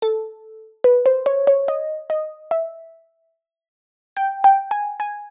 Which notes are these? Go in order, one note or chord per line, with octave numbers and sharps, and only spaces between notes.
A4
B4
C5
C#5
C#5
D#5
D#5
E5
G5
G5
G#5
G#5